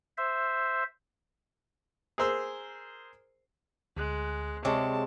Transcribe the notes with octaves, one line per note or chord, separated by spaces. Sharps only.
C5 E5
G#4 A#4 C5 E6
D2 G#3 F#6
C3 G#3 C#5 D5 A5 C#6